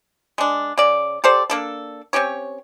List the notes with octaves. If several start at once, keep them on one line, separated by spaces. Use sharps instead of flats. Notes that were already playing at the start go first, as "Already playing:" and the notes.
G#3 D4
C#3 D5
G4 A4 C5 D5
A#3 D4 A4
C4 C#4 G4 C#5